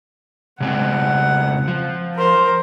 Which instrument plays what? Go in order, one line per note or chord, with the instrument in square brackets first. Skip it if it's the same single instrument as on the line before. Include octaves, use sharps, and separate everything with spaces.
[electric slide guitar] C#3 G#3 C4 [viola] F#5
[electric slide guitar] F3
[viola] A#4 C5